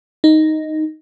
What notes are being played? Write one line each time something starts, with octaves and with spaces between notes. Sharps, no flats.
D#4